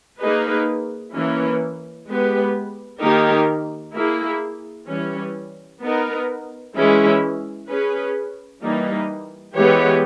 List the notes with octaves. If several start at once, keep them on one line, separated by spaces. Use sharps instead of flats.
A#3 D#4 G#4 B4
E3 A#3 C#4 E4
G#3 B3 G4 B4
D#3 A#3 D#4 G4 A#4
A#3 E4 G#4
E3 G3 C#4
B3 D#4 A#4
E3 G#3 C#4 E4
C#4 G#4 B4
E3 G3 A#3 D#4
E3 G#3 B3 G4 C#5